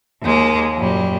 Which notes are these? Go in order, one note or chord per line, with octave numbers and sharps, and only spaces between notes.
D#2 G#3 A#3
F#2 A#2 G3